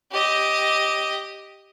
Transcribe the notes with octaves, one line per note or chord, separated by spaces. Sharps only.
G4 D#5